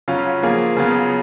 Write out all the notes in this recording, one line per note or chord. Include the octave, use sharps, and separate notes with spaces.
C#3 F#3 C#4 F4
F3 A#3 F4 G#4
C#3 F#3 B3 F4 G#4